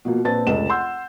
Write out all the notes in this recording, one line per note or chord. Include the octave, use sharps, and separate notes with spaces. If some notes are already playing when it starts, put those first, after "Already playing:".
B2 F3 A#3
A#1 C4 B4 A5 A6
F1 C#2 E7
F#5 C6 E6 G6